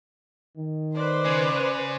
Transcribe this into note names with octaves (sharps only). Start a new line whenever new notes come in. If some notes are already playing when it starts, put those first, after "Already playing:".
D#3
B4 C5 D5
C#3